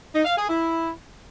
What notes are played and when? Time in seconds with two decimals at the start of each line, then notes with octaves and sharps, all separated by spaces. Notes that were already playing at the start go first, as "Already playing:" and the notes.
0.14 D#4
0.25 F5
0.36 G#4
0.48 E4